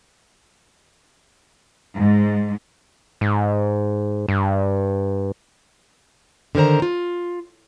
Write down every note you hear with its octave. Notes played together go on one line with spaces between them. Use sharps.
G#2
G#2
G2
D3 D#3 A#4 C5 A#5
F4